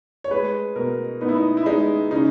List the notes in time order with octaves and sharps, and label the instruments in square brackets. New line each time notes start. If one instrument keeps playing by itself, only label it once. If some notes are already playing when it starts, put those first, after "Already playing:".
[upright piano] C#5
G#3 B4
B2 A#4
B3 D#4
E4
D#4
E4
G#3 D#4
C#3 D#4